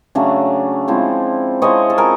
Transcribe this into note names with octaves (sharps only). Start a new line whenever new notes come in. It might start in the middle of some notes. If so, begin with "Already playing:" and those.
C#3 F#3 A3 D4
F3 G#3 C4 E4
F3 G#3 C4 E4 C#5 D#5
A4
G#4 A#4